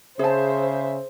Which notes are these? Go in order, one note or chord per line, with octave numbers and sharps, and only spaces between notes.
C#3 G#4 C5 E5 A5